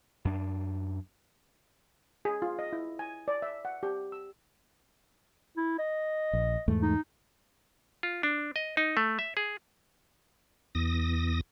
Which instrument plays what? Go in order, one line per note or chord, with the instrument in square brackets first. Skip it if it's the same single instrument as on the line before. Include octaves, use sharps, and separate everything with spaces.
[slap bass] F#2 D4
[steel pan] G#4
F4
D#5
E4
G#5
D5
E5
F#5
G4
E6
[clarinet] E4
D#5
[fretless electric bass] A#1
E2 G#2 A3
[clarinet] D#4
[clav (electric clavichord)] F4
D4
D#5
D#4
A3
E5
G#4
[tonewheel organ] E2 D#6 A#6